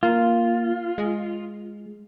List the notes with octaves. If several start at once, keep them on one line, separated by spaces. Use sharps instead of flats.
A#3 F4
G#3